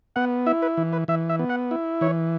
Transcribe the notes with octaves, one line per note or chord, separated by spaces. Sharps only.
B3 F#5
E4 E5
B4
E3
B4
E3 E5
E5
B3
F#5
E4
E3 C#5